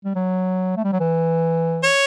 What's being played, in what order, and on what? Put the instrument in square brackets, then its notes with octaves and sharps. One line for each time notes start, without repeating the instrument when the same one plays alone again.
[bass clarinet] G3
F#3
A3
G3
F#3
E3
[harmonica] C#5